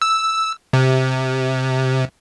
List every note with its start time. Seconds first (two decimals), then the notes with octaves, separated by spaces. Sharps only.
0.02 E6
0.73 C3